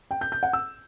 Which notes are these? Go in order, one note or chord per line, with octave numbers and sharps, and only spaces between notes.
G5
G6
G6
F#5
E6